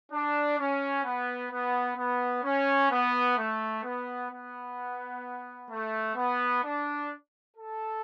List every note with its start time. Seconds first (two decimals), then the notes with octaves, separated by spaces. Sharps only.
0.12 D4
0.59 C#4
1.04 B3
1.52 B3
1.97 B3
2.44 C#4
2.91 B3
3.38 A3
3.84 B3
4.30 B3
5.71 A3
6.16 B3
6.64 D4
7.57 A4